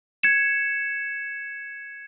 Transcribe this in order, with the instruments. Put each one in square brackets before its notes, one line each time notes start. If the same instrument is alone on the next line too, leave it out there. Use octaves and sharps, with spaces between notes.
[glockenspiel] G#6 C#7 E7